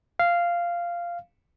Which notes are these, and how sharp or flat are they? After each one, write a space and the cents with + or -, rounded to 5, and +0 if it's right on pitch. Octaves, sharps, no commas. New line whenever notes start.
F5 -10